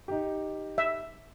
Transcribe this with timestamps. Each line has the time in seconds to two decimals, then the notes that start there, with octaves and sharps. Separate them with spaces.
0.08 D#4 G4
0.78 E5